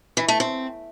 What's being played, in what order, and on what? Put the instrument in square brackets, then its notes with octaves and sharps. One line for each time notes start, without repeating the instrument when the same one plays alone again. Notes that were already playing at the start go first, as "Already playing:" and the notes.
[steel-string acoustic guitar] E3
A3
C4